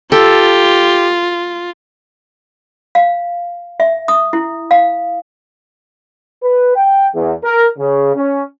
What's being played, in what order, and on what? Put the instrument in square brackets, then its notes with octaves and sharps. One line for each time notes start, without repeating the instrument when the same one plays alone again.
[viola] F4 [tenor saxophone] G4 [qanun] A4
[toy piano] F5
E5
D#6
E4
F5
[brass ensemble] B4
G5
E2
A#4
C#3
C#4